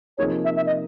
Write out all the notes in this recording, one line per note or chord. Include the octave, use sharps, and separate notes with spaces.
C3 F3 A#3 D#4 G#4 C#5
E5
E5
D#5